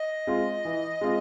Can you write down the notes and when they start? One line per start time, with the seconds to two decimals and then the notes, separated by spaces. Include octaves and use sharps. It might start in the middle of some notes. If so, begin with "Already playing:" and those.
Already playing: D#5
0.27 G#3 C4 F4
0.65 E3
1.01 G#3 C4 F4